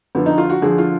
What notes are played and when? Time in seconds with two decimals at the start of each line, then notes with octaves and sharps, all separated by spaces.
0.15 D3 F3 B3
0.26 D#4
0.38 F4
0.50 F#4
0.62 D3 F3 G#4
0.78 F4